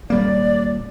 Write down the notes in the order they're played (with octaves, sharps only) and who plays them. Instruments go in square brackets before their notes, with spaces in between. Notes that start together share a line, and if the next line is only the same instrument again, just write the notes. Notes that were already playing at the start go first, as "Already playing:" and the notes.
[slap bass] D#1 G3 A#3 [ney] D5